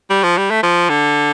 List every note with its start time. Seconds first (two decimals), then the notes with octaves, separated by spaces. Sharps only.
0.10 G3
0.24 F3
0.37 G3
0.51 A3
0.63 F3
0.89 D3